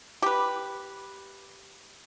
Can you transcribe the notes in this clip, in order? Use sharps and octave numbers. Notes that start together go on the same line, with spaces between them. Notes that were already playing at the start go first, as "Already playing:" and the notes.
G4 B4